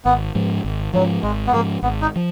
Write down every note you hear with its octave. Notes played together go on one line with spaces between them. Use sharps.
G#1 B3
G#2 F3
G#1
G#2 F3 F#3
G#1 G#3
B3
G#2 F3 A#3
G#1 B3
D#4
F3